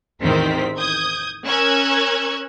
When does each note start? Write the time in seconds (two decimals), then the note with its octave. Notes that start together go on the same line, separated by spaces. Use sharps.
0.22 A1 E2 D#3 C4 C5 B6
0.77 D#6 G6 G#6
1.46 C#4 A#4 C#6 E6 F#6 G#6